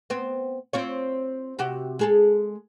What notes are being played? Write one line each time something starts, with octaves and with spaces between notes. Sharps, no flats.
B3 C4
C4 F4 C#5
C3 F#4 G4
G#3 G#4 A4